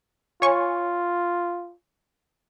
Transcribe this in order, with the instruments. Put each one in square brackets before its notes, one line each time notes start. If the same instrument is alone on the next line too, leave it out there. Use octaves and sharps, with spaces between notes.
[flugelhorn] F4 [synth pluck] C#5 G#5 C#6